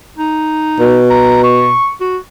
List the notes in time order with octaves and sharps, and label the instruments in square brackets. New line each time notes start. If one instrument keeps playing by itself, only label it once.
[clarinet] D#4
[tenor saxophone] B2
[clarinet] A#5
C#6
F#4